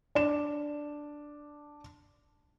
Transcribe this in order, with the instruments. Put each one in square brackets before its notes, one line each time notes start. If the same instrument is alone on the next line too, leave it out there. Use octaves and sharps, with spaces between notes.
[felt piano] D4 E7